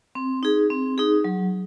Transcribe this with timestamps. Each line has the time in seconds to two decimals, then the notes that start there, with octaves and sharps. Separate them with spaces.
0.15 C4
0.43 D#4 G#4
0.70 C4
0.98 D#4 G#4
1.24 F#3